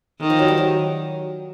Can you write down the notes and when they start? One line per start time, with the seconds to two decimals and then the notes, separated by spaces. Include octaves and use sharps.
0.20 D#3
0.30 F3
0.39 F#3
0.48 G3
0.58 F#3